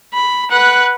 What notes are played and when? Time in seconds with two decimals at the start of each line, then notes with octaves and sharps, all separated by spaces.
0.14 B5
0.51 B4 F#5